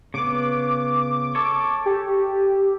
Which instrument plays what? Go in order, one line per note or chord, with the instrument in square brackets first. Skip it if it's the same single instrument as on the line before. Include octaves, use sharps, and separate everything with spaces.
[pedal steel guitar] C#3 B3 [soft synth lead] D6
[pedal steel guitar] A4 C#5
[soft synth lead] G4